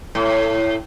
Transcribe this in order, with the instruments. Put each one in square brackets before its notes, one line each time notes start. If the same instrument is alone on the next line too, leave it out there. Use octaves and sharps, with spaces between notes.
[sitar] A2